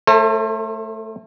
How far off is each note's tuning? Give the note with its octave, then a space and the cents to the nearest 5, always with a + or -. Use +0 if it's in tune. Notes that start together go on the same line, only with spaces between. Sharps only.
A3 +0 A4 +45 C5 +40